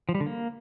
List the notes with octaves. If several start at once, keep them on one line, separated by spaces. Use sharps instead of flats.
F3
G3
D3
A#3